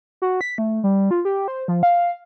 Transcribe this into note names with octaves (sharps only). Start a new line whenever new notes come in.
F#4
B6
A3
G3
F4
G4
C5
F3
F5